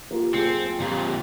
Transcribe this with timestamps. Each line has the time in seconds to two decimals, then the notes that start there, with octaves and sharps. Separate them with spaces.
0.11 A#3 F4 G4
0.34 F#1 C4 F4 G#4 A4 C#7
0.80 F2 A#2 D3 G4